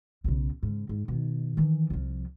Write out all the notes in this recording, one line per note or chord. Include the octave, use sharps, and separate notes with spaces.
B1 C#3
G#2 C#3
G#2
B2 D#3
D#3 E3
C2 F3